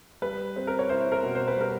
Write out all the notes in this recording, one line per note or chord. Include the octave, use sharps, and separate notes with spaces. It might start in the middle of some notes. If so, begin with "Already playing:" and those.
G3 B4
C4
A#4
C#5
E4 C5
A#4
B2
C5
B4
G3 A#4